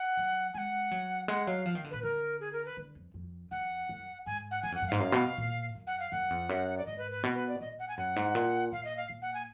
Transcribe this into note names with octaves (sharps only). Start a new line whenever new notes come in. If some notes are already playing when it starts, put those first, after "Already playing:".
Already playing: F#5
F#3
G#3 F#5 G#5
F#3
G#3 F#5
F#3 F5
F3 F5
D#3
D3
A#2 B4
D3 A#4
G#4
A#4
B4
D3
F2
F2
F2 F#5
F#2
G#2 G#5
F#5
F#2 G#5
F2 F#5
F#2
G#2 F5
F#2
B2
A#2
F#2
F#5
F5
F#2 F#5
F2
F#2
D5
G#2 D#5
B4
B4
B2
B4
D5
A#2 D#5
F#5
G#5
F#2 F#5
G#2
A#2
A#2 F5
D#5
F5
A#2
F#5
G#5